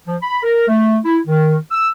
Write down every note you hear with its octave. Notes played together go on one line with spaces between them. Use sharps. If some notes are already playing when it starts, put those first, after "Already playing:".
F3
B5
A#4
A3
E4
D#3
E6